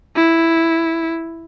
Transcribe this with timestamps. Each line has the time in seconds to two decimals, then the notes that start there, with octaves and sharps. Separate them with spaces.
0.15 E4